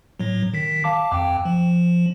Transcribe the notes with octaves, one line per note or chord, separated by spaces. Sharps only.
A2 F#3
D#3 B6
F5 A5 D6
F2 G5
F3